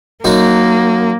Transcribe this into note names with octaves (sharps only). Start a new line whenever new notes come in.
F#2 A#3 D#4 F#4